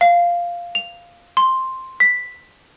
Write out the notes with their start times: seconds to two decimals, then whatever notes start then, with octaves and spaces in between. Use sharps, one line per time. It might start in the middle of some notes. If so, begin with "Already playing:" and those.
0.01 F5
0.75 F7
1.37 C6
2.00 B6